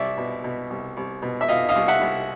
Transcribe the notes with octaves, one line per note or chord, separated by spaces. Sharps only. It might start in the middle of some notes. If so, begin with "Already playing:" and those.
Already playing: C2 D5 E5
B2
B2
C2
C2
B2
E5
B2 D#5 F5
D#5 F5
C2
E5 F#5
C2